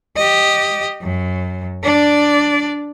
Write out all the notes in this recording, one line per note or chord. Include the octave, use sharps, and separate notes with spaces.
G4 D#5
F#2
D4 D5